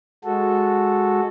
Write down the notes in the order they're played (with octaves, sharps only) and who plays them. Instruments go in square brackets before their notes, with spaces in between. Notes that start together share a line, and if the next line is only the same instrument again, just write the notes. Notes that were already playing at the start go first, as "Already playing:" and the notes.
[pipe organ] G#3 F#4 A4